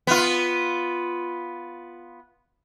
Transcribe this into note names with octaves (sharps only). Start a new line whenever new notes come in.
B3 F4